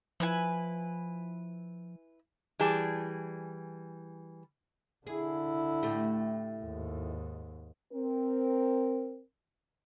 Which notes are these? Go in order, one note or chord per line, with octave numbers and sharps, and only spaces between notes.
F3 E4 B4 G#5
E3 G3 G#4 A5
D3 E4 G#4
A2 A3 G4
D#2 G#2
C4 A#4